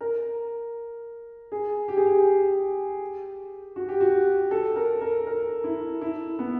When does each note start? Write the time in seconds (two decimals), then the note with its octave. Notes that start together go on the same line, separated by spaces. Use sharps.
0.01 A#4
1.52 G#4
1.88 G4
1.97 G#4
2.06 G4
3.76 F#4
3.89 G4
4.01 F#4
4.51 A4
4.76 A#4
5.01 A#4
5.27 A#4
5.64 E4
6.01 E4
6.39 B3